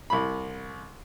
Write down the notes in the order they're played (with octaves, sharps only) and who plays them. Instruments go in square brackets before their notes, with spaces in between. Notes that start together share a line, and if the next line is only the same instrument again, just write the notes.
[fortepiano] C2 B5